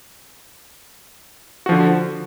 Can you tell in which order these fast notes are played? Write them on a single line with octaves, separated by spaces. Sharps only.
F#4 F3 D3